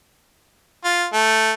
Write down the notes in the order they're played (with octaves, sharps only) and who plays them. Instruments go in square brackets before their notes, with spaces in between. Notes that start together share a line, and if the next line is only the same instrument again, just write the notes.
[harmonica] F4
A3